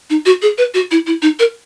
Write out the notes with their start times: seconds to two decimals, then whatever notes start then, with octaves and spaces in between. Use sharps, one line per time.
0.10 D#4
0.26 F#4
0.42 G#4
0.58 B4
0.74 F#4
0.91 E4
1.07 E4
1.22 D#4
1.39 A#4